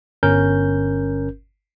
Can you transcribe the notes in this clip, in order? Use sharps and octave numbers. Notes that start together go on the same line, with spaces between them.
G1 C#4 A#4 G6